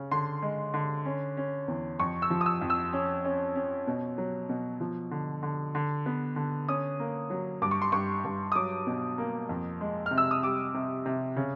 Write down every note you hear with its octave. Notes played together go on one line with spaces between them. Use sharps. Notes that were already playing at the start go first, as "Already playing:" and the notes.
Already playing: C#3
D3 C6
G#3
D3
C#4
C#4
E2
F2 C#6
E6
F3
D#6
E6
F2
E6
C#4
C#4
C#4
B2
F#3
B2
F3
D3
D3
D3
B3
D3
C#4 D#6
A#3
F#3
G2 D6
C#6
C6
G2 C#6
G2
D#6
F#3 D6
B2
A#3
F2
G#3
F6
C3
E6
D#6
G3 D6
C3
C3
C#3